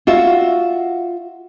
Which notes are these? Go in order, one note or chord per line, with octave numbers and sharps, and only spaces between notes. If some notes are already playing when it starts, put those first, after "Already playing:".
F4 F#4 E5